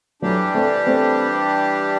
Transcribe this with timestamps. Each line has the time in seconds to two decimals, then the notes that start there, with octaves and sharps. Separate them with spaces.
0.22 E3 F#3 G3 A3 D4 G4
0.54 A3 C4
0.86 A3 C4